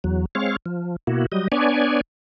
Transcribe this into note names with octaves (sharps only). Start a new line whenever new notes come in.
E2 F#3
G#3 C4 C#5 F5
F3
B2 A#3 E4 F#4
F#3 G3 D#5
B3 D4 C#5 D5 G#5